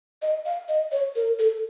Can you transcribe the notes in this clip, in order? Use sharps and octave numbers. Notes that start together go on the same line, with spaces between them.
D#5
F5
D#5
C#5
A#4
A4